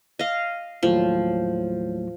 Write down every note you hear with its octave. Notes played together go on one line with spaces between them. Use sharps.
D#5 F5
D#2 A2 F3 F#3